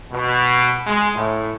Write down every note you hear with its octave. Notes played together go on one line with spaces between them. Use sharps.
B2
G#3
A2